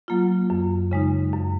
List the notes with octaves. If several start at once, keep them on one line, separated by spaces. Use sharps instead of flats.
F#3 A#3 F4
F#2
C#3 G#3 D#4
F#2